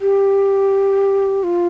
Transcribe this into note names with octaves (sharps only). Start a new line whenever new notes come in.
G4
F4